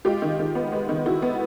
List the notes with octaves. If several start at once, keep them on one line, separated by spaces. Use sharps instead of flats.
G#3 F4 G4
D#3
D#3
B3
G#3
D#3
D#3 E4 F#4
B3